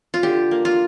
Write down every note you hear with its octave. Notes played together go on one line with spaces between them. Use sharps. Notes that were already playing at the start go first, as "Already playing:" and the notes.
F4
D3 G4
A#3
F4